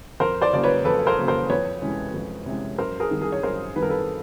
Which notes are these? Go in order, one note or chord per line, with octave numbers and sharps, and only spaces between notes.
F2 A#4 C5
C5 D5
C#3 F#3 A#3 D5
B4 C#5
F2 A4 B4
A#4 C5
C#3 F#3 A#3
A#4 C5
F2 B4 C#5
C3 E3 G#3 C#4
F2
C3 E3 G#3 C#4
F#2 A#4 C5
G#4 A#4
D#3 G3 C4
G#4 A#4
C#5
F#2 A#4 C5
D#3 G3 C4 B4
A#4
A4 B4